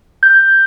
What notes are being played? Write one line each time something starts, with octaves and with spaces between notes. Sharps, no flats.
G6